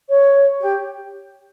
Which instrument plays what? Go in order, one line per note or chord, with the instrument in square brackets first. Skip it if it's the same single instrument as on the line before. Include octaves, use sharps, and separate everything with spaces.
[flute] C#5
G4